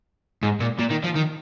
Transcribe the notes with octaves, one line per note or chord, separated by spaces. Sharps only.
G#2
A#2
A#2
D#3
F3
D#3